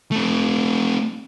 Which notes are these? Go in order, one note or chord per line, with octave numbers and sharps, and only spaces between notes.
A3 C4